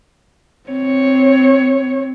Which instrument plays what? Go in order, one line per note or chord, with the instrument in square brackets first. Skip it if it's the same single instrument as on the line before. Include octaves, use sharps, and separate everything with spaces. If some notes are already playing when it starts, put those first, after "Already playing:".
[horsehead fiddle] C4 C#5